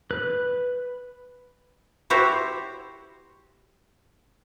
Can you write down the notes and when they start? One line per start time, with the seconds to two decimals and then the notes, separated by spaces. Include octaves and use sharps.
0.11 B4 F#6
2.10 E4 F#4 G4 C5 C#5 E5